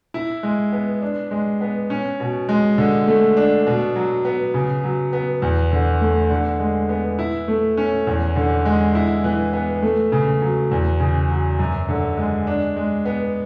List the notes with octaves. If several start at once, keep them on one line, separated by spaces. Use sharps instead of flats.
E4
G#3
B3
D4
G#3
B3
C#4
B2
G#3
D3
A3
D4
B2
F#3
B3
C#3
F#3
B3
E2
D3
A3
D3
G#3
B3
E4
A3
C#4
E2
D3
G#3
E4
E3
B3
A3
C#3
F#3
E2
C#3
F#3
F#2
D3
G#3
D4
G#3
B3